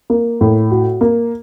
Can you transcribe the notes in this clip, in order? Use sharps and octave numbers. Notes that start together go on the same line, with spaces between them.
A#3
A2
F#4
A#3